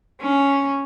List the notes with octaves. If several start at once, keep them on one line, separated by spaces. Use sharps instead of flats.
C#4